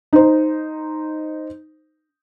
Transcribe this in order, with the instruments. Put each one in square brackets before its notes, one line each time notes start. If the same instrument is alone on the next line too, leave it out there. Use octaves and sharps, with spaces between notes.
[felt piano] D#4 C5